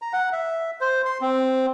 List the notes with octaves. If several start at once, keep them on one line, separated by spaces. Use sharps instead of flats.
A#5
F#5
E5
C5
C6
C4